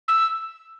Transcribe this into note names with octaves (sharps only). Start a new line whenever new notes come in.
E6